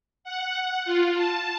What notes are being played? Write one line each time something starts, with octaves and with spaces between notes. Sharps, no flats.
F#5
F4
A5